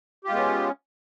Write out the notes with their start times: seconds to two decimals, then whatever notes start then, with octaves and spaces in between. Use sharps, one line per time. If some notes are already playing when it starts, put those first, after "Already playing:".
0.25 G4
0.27 F4
0.30 G#3
0.33 B3
0.36 C#4